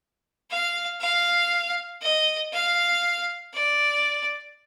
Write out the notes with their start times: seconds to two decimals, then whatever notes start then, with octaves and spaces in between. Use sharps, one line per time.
0.50 F5
1.01 F5
2.02 D#5
2.52 F5
3.53 D5